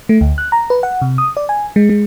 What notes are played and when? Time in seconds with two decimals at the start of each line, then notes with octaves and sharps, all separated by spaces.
0.09 A3
0.21 D2
0.38 F#6
0.52 A#5
0.70 B4
0.83 F#5
1.02 C3
1.18 D#6
1.37 D5
1.49 G#5
1.76 G#3
1.89 G#3